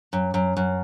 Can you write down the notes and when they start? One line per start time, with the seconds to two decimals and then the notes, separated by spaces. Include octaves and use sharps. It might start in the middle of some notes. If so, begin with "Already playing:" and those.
0.13 F#2
0.34 F#2
0.57 F#2